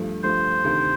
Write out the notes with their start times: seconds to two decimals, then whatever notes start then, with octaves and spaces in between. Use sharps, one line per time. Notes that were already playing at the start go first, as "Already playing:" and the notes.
Already playing: G2 F3 A3
0.23 G2 F3 A3 C5
0.64 D2 C3 D#3